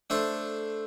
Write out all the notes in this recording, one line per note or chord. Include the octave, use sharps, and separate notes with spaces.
A3 D4 A4 C5